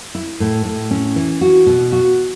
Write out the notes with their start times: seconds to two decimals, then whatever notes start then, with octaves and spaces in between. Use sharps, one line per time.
0.15 E4
0.40 A2
0.65 A2
0.91 C#4
1.16 E3
1.41 F#4
1.66 B2
1.92 F#4